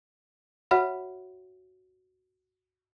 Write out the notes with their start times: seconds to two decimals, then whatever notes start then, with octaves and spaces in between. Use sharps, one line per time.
0.71 F#4 C#5 E5 F#5 B5